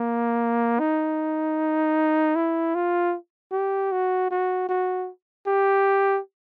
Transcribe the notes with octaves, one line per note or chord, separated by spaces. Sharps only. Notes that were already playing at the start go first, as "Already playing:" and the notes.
Already playing: A#3
D#4
E4
F4
G4
F#4
F#4
F#4
G4